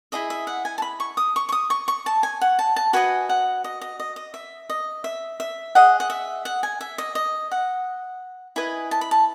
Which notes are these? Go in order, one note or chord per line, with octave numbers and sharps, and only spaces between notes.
E4 G#4 D#5 E5
E5
F#5
G#5
A5
B5
C#6
D#6
C#6
C#6
D#6
C#6
C#6
A5
G#5
F#5
A5
A5
F#4 B4 D#5 G#5
F#5
D#5
D#5
D#5
D#5
E5
D#5
E5
E5
G#4 D#5 F#5
F#5
E5
F#5
G#5
E5
D#5
D#5
F#5
E4 B4 D#5 G#5
A5
B5
A5